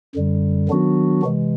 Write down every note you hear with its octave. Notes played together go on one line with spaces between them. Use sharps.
F#2 D3 G3
D#3 F#3 B3 D4 F#4
C3 E3 G#3